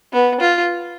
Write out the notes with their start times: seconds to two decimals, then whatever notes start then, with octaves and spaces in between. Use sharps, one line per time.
0.13 B3
0.41 F4